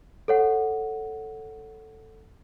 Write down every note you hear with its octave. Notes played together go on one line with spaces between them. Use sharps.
A4 C#5 F#5